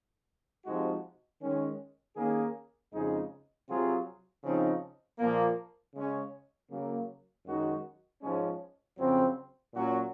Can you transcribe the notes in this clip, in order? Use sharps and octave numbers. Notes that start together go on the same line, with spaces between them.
C3 F3 G#3 D#4 F#4
D#3 G#3 C#4
D#3 A#3 C#4 G#4
F2 C#3 G#3 D#4 G#4
C3 F#3 C4 F4 G#4
C#3 F3 C4 D#4
A#2 F3 A#3
C#3 G#3 C#4
C#3 F#3 A#3
F#2 D#3 G#3 D#4 F#4
G#2 F3 G#3 C#4
F2 C#3 F#3 C4
A#2 F#3 C#4 F#4